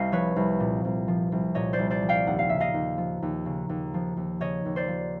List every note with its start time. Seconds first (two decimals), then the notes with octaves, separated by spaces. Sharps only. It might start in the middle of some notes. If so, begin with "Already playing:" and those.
Already playing: C2 D#5 F5
0.12 F3 B4 C#5
0.36 C2
0.60 A#2
0.85 C2
1.08 F3
1.32 C2
1.55 A#2 C#5 D#5
1.73 C5 D5
1.79 C2
1.90 C5 D5
2.02 F3
2.09 F5 G5
2.27 D#2 F#5
2.39 F5
2.49 C#3 E5
2.60 D#5 F5
2.74 D#2
2.98 F3
3.22 D#2
3.46 C#3
3.69 D#2
3.94 F3
4.17 D#2
4.40 C#3 C#5 D#5
4.65 D#2
4.76 C5 D5
4.88 F3